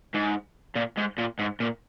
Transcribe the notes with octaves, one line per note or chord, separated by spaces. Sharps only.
G#2
A#2
G#2
A#2
G#2
A#2